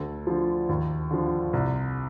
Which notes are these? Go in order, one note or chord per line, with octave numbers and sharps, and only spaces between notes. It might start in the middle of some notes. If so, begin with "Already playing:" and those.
Already playing: D2 A4
D3 F3
D#2
D3 F3
C2